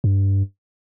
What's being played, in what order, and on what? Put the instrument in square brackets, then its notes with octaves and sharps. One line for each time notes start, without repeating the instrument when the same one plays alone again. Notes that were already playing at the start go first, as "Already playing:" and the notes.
[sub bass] G2